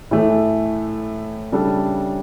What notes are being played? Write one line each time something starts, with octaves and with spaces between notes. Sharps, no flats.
A2 E3 A3
C#3 G3 D4 A4